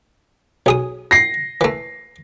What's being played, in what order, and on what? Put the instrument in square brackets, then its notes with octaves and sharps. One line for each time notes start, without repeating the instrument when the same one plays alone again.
[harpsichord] B1 G#4 D#6
[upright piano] A#6 C7
[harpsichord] E3 A3